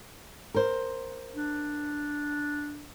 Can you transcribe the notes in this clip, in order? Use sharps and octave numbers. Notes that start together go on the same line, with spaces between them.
A#4 C5
D4